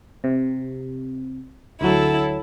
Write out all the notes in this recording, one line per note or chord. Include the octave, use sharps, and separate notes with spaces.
C3
D2 F#3 E4 A4